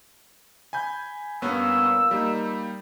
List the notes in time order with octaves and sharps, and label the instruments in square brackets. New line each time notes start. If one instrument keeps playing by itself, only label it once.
[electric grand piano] G#5 B5 G6
[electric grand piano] G2 B3 C#4 [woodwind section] A#2 E6
[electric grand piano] G3 A#3 D#4